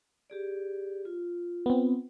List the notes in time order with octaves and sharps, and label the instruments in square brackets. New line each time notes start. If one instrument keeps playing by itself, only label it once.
[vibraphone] G4 G#4 D5
F4
[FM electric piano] B3 C4